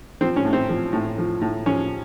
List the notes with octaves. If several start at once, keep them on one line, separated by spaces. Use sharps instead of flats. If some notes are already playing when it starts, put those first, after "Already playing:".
F3 C4
C#4
A2
C4
F3
A2
F3
A2
F3 C#4